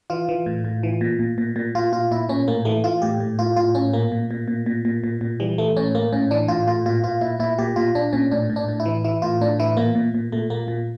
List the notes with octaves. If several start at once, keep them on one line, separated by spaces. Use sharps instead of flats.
E3 F4
E3
A2
A2
E3
A#2
A#2
A#2
A#2
A#2 F4
A#2 F4
A#2 E4
A#2 C#4
A2 A#3
E3 A3
E3 F4
A2 G4
A2
A2 F4
A2 F4
A2 C#4
A#2 A#3
A#2
A#2
A#2
A#2
A#2
A#2
A#2
E3 G3
E3 A3
A2 C#4
A2 A#3
A2 C#4
E3 D4
A2 F4
A2 F4
A#2 F4
A#2 F4
A#2 E4
A#2 E4
A#2 G4
A#2 F4
A#2 D4
A#2 C#4
A2 D4
A2
D4
A2
E4
E3
E3 E4
A2 F4
A2 D4
E3 E4
A#2 A#3
A#2
A#2
A#2 A3
A#2 A#3
A#2